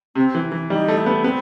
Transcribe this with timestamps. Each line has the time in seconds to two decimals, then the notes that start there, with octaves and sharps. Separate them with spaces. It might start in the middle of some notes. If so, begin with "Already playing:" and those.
0.15 C3 C4
0.35 E3
0.52 E3
0.70 G3 D#4
0.88 A3
0.97 E4
1.06 B3
1.24 B3 C4